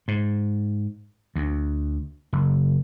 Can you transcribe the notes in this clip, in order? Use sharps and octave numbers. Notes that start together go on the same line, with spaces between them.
G#2
D2
F#1